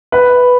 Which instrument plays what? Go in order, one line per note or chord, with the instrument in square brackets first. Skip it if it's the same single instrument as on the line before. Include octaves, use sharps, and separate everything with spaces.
[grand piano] B4